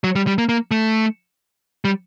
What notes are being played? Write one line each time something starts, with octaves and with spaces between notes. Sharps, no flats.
F#3
G3
G3
A#3
A#3
A3
G3